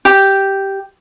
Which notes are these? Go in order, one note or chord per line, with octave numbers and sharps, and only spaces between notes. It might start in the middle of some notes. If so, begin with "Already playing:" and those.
G4